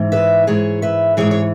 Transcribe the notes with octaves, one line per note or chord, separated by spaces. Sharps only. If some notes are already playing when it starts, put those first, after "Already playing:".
Already playing: G#2 E3
B4 E5
G#2 E3 G#4 C#5
B4 E5
G#2 E3 G#4 C#5
C#5